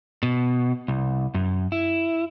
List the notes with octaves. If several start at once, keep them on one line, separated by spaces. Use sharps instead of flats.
B2
C2
F#2
E4